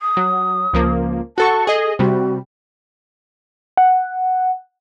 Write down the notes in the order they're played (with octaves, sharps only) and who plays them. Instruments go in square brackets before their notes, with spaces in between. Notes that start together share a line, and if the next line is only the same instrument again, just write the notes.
[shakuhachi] D#6
[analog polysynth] F#3
C#2 F3 A#3
[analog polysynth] F#4 A4 C#6 [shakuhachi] A5
[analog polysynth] G#4 D#5 [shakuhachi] A4
[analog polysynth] C3 G3 [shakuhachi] F#4
[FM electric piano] F#5